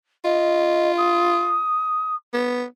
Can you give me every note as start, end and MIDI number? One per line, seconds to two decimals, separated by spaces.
0.24 1.62 65
0.24 0.91 75
0.98 2.15 87
2.34 2.65 59